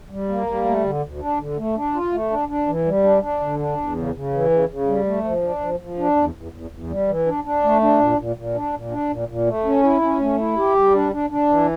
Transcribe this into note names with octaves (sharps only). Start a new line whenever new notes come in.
G3
A#3
G3
A3
D3
D2
D4
D3
A3
D4
F4
A3
D4
D4
E3
G3
D4
D4
D3
D4
E2
C#3
C#3
E3
C#3
C#3
G3
A3
F3
D4
F3
F3
D4
E2
E2
E2
E2
G3
E3
D4
D4
A3
D4
A#2
A#2
A#2
D4
A#2
D4
A#2
A#2
A3
C#4
E4
C#4
A3
E4
G4
G3
D4
D4
D4
E3